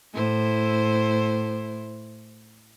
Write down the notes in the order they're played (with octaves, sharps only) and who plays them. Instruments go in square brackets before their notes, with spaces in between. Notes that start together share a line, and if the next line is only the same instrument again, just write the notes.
[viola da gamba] A2 E4 C5